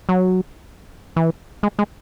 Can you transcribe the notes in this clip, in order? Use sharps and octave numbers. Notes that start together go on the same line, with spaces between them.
F#3
E3
G#3
G#3